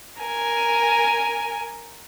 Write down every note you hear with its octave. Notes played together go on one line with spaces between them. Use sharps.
A#4 G#5